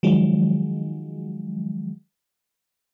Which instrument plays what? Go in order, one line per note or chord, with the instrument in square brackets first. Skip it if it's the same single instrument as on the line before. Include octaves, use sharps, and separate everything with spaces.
[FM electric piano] D#3 F3 F#3 G#3